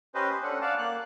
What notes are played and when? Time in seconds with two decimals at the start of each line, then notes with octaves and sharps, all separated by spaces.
0.15 C#4 G4 B4 C5 D#5
0.29 C5
0.43 C#4 D4 A4 F#5
0.61 D5 F5 F#5 A5
0.78 A#3 F#6